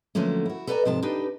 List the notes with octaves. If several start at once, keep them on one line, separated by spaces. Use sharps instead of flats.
D3 F3 F#3 A3 A#3 C#4
E4 F#4
A4 B4 D5 F5 G#5 A#5
G#2 C3 F3 A5
D4 D#4 G4 B4